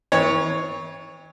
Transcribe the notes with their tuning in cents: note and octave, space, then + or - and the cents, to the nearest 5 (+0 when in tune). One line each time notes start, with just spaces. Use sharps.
E3 -45 C#5 +0